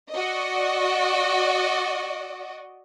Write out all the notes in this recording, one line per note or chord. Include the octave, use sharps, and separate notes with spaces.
F#4 D5 D#5